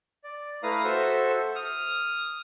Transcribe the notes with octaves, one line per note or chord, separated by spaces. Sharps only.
D5
A3 E4 B4 F5 A#5 D#6
F#4 A4 C5 E5
D#6 F6